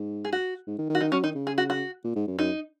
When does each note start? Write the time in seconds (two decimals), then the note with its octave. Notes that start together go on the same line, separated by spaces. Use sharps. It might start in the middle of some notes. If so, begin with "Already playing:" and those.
Already playing: G#2
0.25 G#4
0.33 F#4
0.67 G#2
0.78 D#3
0.90 D#3
0.95 F#4
1.01 D#3 D#4
1.12 F#3 C#4
1.23 D#3 D#4
1.35 C#3
1.47 G#4
1.58 F#4
1.70 F#4
2.04 A#2
2.15 G#2
2.27 F#2
2.38 F#2 D#4